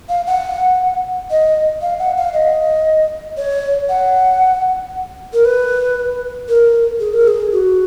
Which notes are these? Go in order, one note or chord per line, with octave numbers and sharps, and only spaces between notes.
F5
F#5
D#5
F5
F#5
F5
D#5
C#5
F#5
A#4
B4
A#4
G#4
A#4
G#4
F#4